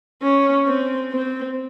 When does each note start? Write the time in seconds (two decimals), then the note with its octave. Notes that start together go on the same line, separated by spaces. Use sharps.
0.22 C#4
0.67 C4
1.12 C4